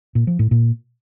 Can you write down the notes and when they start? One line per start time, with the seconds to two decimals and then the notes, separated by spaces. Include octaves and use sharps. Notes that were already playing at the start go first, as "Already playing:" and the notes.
0.15 A#2
0.27 F3
0.39 A2
0.51 A#2